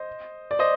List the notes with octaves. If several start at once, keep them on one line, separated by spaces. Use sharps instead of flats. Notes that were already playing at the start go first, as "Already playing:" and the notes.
Already playing: C5 D#5
D5
C5 D#5